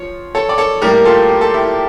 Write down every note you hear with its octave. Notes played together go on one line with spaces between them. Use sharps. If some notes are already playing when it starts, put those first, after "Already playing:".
Already playing: F3 C#5
A4 C#5
D5
A4 C#5
A2 G3 A#3 G4 A#4
A#4
F4 A4
G4
A4
E4 G4